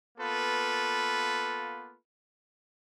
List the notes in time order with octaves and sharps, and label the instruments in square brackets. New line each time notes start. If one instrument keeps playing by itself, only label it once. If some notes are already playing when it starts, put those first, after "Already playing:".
[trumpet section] A#3 B3 F4 A4 B4